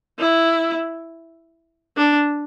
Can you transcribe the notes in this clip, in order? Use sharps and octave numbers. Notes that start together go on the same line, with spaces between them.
E4
D4